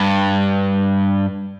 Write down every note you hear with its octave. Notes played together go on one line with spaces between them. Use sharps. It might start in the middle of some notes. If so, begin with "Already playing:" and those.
Already playing: G2